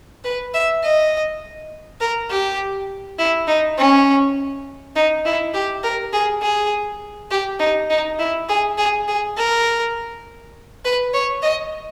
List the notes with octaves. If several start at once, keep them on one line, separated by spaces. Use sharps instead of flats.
B4
E5
D#5
A#4
G4
E4
D#4
C#4
D#4
E4
G4
A#4
G#4
G#4
G4
D#4
D#4
E4
G#4
G#4
G#4
A#4
B4
C#5
D#5